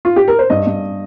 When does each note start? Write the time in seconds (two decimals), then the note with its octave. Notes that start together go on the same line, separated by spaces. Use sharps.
0.05 F4
0.16 G4
0.28 A#4
0.39 C5
0.50 G2 D#5
0.67 G2